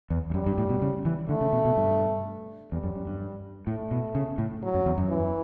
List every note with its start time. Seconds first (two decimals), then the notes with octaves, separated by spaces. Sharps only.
0.10 E2
0.30 E2
0.34 F#2 G3
0.46 G2
0.58 A2
0.70 B2
0.82 C#3
1.05 E3
1.29 D3 A3
1.41 C#3
1.53 B2
1.65 B2
1.77 G2
2.72 E2 G3
2.84 F#2
2.96 F#2
3.07 G2
3.67 A2 A3
3.91 B2
4.15 C#3
4.38 A2
4.63 F#3
4.74 F#2
4.86 E2
4.98 F#2
5.09 E3